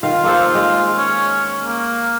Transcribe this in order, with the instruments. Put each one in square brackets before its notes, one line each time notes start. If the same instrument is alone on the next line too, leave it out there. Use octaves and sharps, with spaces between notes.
[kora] D#3 F5 [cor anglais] F4
[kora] A#3 A4 C5
G#3
[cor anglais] C#4
A#3